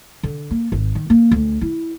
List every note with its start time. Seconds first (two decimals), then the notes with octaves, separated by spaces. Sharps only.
0.23 D3
0.51 A#3
0.72 G#1
0.95 D#3
1.10 A#3
1.31 D2
1.61 E4